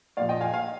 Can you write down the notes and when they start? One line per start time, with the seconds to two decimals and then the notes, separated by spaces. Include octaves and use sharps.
0.17 A#1 A#2 F3 D5 F5
0.29 D#5 G5
0.41 F5 G#5
0.53 F5 G#5